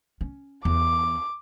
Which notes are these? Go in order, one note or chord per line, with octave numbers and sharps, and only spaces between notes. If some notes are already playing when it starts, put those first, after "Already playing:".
C#4
E2 D6